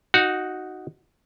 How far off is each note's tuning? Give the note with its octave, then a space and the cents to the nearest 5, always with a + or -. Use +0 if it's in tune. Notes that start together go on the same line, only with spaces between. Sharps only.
D#4 +0 F#4 +0 F5 +40